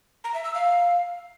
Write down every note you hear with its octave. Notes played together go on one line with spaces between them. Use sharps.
A#5
E5
E6
F5